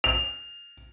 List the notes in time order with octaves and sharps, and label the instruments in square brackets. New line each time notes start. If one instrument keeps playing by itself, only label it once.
[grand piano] F7